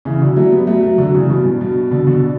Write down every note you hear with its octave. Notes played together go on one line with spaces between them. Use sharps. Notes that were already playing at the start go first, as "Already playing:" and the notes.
C#3 E3
D3 F#3
F#3 A3
G3 B3
F#3 A3
F#3 A3
D3 F#3
C#3 E3
G2 B2
G2
G2 B2
B2 D3
B2 D3
B2